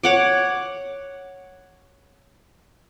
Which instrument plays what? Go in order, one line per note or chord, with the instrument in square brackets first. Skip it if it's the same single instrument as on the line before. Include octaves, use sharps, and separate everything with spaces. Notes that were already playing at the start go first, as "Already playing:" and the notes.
[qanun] C#5 F#5 D6